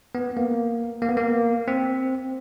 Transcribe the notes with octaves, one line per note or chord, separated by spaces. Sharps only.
B3
A#3
A#3
B3
A#3
C4